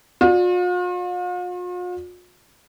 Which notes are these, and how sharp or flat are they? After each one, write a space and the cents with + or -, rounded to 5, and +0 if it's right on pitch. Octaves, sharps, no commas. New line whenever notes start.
F4 +45 D5 +15